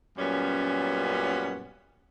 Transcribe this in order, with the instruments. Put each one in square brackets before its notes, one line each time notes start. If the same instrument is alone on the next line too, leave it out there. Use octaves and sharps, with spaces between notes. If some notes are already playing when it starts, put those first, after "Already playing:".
[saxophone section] F#2 A#2 G3 B3 C#4